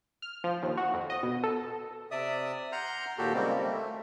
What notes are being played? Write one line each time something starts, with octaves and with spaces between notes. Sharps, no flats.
F6
F3
D#2
F#4
F2
D#5
B2
A4
C3 D5 E5 D#6
F#5 A#5 C6 F6 G6
D#2 A#2 F#4 G4 A4
C#3 G3 G#3 A#3 C4
A3